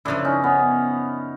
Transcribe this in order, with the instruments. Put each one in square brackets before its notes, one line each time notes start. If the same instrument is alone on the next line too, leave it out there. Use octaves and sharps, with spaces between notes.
[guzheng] F#2 C#3 F3 [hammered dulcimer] D4 E4
[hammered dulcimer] C#4 D#4
B3 C#4